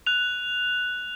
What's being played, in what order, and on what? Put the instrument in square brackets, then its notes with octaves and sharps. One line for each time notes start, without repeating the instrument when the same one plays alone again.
[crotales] F#6 F7